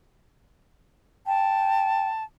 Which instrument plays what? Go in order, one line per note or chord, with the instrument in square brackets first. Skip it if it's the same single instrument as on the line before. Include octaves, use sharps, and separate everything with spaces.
[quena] G5 [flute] A5